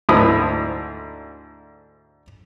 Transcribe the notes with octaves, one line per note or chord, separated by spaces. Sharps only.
D2 G#2 E4 A5 B5 D#6